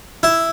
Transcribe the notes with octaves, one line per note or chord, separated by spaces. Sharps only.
E4